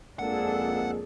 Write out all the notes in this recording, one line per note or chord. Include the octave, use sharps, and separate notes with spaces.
F2 G#3 A#3 D4 G#4 A4 F#5